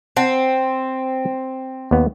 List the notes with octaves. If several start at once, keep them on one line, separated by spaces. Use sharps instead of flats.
C4 C5 F#5 A5
D#2 B3